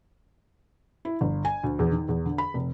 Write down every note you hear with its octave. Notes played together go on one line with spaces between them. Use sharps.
E4
G1
G#5
D2
E2
D#3
E2
D3
B5
F1